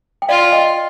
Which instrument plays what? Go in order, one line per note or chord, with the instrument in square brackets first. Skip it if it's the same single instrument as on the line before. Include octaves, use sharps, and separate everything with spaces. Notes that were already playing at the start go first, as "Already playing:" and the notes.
[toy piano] G5
[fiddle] F4 [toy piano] D5 F5
[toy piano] D#5 G5